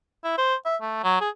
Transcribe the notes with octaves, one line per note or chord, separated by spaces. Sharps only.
E4
C5
E5
A3
F#3
G#4